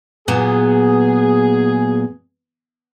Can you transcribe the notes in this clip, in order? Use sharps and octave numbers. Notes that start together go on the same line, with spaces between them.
A#2 F#3 B3 G#4